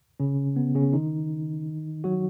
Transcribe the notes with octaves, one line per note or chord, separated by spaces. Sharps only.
C#3 C#4
B3
C#3 C#4
D#3 D#4
F#3 F#4